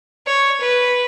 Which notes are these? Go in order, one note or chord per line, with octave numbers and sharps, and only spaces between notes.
C#5
B4